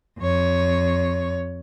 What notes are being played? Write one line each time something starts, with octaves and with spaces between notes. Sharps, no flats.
F2 C#5